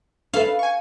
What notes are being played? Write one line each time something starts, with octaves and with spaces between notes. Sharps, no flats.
C#4 A4 B4 F5
G#5 C#6